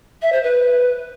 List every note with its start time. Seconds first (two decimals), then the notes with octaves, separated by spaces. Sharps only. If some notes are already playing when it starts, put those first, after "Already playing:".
0.22 E5
0.32 C5
0.43 B4